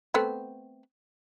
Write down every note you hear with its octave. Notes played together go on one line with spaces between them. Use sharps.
A3 B3 C4